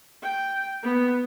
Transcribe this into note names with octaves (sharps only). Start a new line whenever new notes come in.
G5
B3